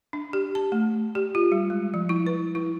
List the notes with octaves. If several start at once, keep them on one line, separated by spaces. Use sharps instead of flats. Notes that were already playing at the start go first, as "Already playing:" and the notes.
D4
G4
A5
A3
G4
F4
G3
G#3
F3
E4
B4
E4